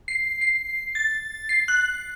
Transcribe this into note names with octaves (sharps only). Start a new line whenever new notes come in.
C7
C7
A6
C7
F#6